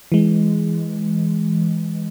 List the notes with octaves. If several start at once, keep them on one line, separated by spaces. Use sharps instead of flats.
E3 G#3